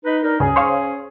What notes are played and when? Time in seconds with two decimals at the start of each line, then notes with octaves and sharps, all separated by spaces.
0.04 D#4 B4
0.23 D4 D#4 A#4
0.40 D2 G2 C#3 C#4 G#4
0.56 C5 C#5 F5